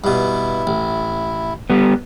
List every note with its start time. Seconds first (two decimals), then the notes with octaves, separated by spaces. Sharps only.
0.04 G2 B2 E4
0.67 A1
1.70 G3 B3